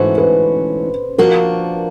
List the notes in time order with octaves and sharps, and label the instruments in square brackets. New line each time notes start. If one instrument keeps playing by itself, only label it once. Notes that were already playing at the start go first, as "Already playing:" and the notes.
Already playing: [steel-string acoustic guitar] G#2 E3 A3 C#4 F#4 [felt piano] C5
[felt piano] B4
[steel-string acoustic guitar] F3 A#3 D4 F#4 [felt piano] A#4